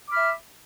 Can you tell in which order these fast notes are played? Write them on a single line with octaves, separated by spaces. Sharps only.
D6 B5 F6 E5